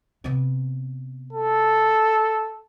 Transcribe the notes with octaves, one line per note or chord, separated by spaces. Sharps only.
C3 B3
A4